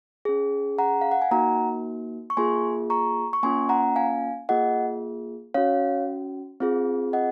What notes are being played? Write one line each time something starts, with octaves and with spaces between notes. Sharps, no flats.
C#4 G#4
F#5 A#5
F5
F#5
G#5
A#3 D#4 F#4 F#5 A#5
C#6
A#3 F4 G#4 G#5 C6
A#5 C#6
C#6
A#3 C#4 F4 G#5 C6
F#5 A#5
F5 G#5
A#3 F4 G#4 D#5 F#5
C#4 F#4 C#5 F5
C4 F4 G#4
D#5 F#5